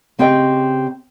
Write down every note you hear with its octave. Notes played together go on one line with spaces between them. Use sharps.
C#3 C4 G4 D#5 G5